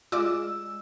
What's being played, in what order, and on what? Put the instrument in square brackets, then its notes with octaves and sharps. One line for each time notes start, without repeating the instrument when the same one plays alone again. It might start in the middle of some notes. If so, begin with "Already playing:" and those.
[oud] G#3 [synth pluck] F4 D5 D6 [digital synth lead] E6